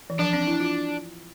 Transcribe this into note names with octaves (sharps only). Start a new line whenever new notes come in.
E3
F3 D4
C4
E4
F4